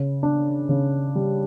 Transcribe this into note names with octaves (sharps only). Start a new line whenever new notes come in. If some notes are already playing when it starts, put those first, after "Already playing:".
Already playing: C#3
D4
C#3
G3